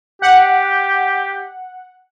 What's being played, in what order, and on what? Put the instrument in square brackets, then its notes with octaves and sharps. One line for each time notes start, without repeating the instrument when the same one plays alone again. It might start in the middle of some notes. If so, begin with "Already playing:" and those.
[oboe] G4 [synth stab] F#5